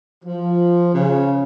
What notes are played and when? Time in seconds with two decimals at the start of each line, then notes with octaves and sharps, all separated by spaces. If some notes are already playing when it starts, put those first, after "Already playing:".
0.25 F3
0.94 C#3